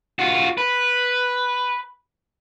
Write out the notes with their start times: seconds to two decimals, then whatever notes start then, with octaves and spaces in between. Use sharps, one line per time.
0.19 F4 F#4
0.58 B4